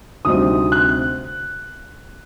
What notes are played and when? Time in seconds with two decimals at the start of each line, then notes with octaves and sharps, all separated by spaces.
0.25 D2 C3 G3 C4 D#4 D#6
0.72 F#6